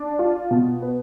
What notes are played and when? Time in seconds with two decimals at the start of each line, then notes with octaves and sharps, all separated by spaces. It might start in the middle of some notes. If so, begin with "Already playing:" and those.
Already playing: D4
0.19 F4
0.51 B2
0.82 B4